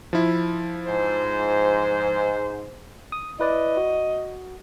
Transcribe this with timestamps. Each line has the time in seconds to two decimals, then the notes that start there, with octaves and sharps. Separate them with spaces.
0.13 F3 E4
0.86 G#2 C5
3.12 D#6
3.40 E4 B4 D5 D#5
3.77 F#4